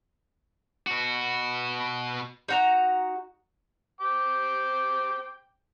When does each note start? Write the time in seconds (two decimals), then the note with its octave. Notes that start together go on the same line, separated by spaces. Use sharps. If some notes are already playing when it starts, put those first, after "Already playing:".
0.87 B2 F#4
2.48 D#4 F#4 A#5
4.01 C5 G5 D6